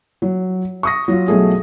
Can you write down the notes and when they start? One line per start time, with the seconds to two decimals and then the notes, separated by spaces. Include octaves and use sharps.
0.22 F#3
0.83 C#6 D#6 A#6
1.08 F#3 F4
1.28 B1 F#3 A3 G#4